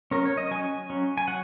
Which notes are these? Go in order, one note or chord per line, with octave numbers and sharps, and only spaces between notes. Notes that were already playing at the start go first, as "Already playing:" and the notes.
F#3 C#4 A#4
C#5
D#5
F#3 C#4 G#5
F#3 C#4
G#5
F#3 F#5